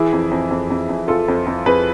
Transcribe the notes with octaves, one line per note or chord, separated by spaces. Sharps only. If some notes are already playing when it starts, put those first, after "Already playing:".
Already playing: E3 E4 G#4
F2
F2
F2
F2
F2
F2 F4 A4
F2
F2
F2 G#4 B4